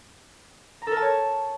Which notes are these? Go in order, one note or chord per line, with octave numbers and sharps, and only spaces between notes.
A#5
A4
A#4
A5
C#5